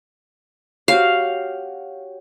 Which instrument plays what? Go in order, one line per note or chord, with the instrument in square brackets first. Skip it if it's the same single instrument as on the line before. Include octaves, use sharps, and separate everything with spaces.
[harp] F#4 G4 C#5 [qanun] F5